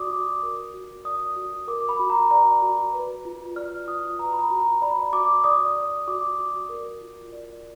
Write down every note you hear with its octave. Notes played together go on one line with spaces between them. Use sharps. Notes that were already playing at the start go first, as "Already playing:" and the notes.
Already playing: F#4 D5 D6 D#6
F#4
A#4
F#4
D5 D#6
F#4
A#4 D6
B5
F#4
A#5
D5 A#5
F#4
B4
F4
D5 F6
F4 D#6
B4 A#5
B5
A#5
F#4
A#5
D5 B5
F#4 D6
D5 D#6
D5
F#4 D6
F#4
A#4
F4
D5